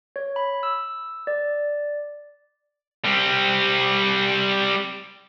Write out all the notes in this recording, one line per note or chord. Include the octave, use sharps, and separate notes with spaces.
C#5
B5
E6
D5
G3 C4